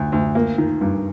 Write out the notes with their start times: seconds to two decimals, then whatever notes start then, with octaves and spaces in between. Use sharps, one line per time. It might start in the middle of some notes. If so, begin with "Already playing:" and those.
Already playing: D2
0.12 D2
0.35 A#3
0.58 D#3
0.81 G2